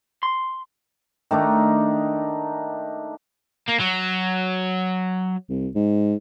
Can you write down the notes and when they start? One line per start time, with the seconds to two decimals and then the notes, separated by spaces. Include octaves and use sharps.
0.23 C6
1.31 D#3 A3 D4 D#4
3.68 A#3
3.80 F#3
5.50 C2
5.75 G#2